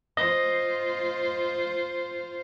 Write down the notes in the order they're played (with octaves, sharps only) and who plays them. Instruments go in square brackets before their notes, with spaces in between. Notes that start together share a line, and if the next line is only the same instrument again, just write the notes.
[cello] F4 C5 [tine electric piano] D#5